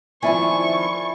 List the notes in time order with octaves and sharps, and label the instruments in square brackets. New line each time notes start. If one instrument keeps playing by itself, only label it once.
[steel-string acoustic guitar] D#3 F3 C4 [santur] E4 D5 G#5 [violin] C#6